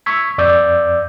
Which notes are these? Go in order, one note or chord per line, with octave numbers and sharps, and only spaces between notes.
C#6 E6 G#6 B6
F2 D5 D6 E6 G6